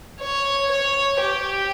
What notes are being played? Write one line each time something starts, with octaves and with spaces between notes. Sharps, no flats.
C#5
C#5
G4